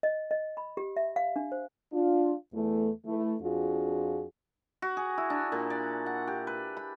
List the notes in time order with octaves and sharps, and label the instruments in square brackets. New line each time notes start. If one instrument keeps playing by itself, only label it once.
[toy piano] D#5
D#5
B5
G4
E5
F5
D4
C5
[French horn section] D4 F4
E2 E3 A3
E3 A3
F2 D4 F4 F#4 G#4
[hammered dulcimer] F#4
G#4
E4
D4
A#2
D5
F#5
G4
B4
B5